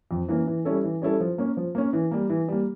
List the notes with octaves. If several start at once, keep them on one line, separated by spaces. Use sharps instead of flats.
F2
E3 A#3 C#4
E3
G3 C#4 E4 A4
E3
G3 C#4 E4 A4
F3
A#3 C#4
F3
A#3 C#4
E3
G3 A#3
E3
G3 A#3